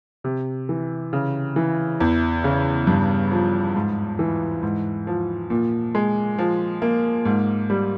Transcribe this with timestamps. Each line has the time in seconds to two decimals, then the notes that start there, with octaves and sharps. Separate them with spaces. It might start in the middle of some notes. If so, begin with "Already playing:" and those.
0.24 C3
0.69 E3
1.13 C#3
1.56 E3
2.01 E2
2.44 C#3
2.87 G2
3.32 F3
3.76 G#2
4.19 E3
4.63 G#2
5.07 F3
5.50 A#2
5.95 G#3
6.38 F3
6.82 A#3
7.25 G#2
7.70 G3